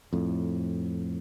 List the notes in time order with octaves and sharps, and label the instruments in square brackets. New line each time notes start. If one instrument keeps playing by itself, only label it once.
[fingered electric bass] F2 A2